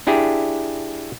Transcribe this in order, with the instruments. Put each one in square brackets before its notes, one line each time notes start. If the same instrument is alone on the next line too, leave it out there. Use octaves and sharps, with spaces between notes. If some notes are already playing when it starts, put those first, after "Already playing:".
[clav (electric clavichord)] D4 E4 G4 G#4